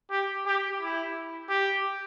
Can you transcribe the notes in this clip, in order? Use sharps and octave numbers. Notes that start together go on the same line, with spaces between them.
G4
G4
E4
G4